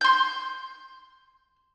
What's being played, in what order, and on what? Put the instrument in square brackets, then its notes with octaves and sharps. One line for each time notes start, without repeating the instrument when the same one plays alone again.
[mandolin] C6 G6